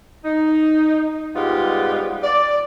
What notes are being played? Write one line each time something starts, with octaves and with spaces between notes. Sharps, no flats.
D#4
G#2 G3 G#3 B3 F4 G4
D5